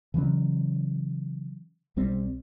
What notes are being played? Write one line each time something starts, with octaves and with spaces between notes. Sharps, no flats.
C#3 E3 F#3 C#4
B1 G3 C4